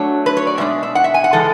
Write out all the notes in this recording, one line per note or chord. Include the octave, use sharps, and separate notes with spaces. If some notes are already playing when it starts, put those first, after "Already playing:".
Already playing: F#3 A3 D4 C#5
B4
C#5
D5
B2 G#3 D4 E5
E5
F#5
E5
G#5
F#5
C#3 E3 G#3 A4